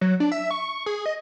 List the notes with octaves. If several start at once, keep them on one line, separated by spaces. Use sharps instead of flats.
F#3
D4
E5
C#6
G#4
D#5